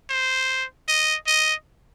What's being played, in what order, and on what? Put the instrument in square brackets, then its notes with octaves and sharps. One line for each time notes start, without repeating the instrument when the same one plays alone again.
[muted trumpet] C5
D#5
D#5